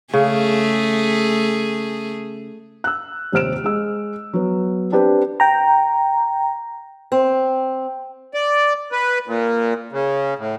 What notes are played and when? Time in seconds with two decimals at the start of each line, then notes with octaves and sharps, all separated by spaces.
0.14 C#3 A3 G#4
2.84 E6 F#6
3.32 D#1 C3 C5 F6 D7 E7
3.64 G#3 E6
4.33 F#3 B3
4.92 C4 D4 G4 B4
5.40 G5 A#5
7.12 C4
8.34 D5
8.92 B4
9.27 A#2
9.92 C#3
10.38 A2